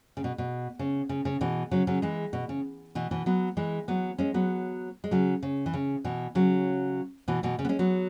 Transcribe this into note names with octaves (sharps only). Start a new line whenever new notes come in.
C#3
B2
B2
C#3
C#3
C#3
B2 E3
C#3 F#3
C#3 F#3
E3 G#3
B2
C#3
B2 E3
B2 E3
F#3 B3
E3 G#3
F#3 B3
G#3 C#4
F#3 B3
G#3
C#3 F#3
C#3
E3
C#3
B2 E3
C#3 F#3
B2 E3
B2 E3
C#3
B3
G#3 C#4
F#3 B3